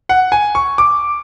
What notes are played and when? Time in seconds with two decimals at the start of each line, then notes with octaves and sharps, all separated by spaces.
0.09 F#5
0.32 G#5
0.55 C#6
0.78 D6